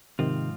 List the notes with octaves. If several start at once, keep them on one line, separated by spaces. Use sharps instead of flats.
G#2 C3 D#3 F3 C4 F4